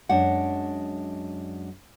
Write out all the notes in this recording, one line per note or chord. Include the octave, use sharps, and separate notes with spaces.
F#2 G#3 D4 F#5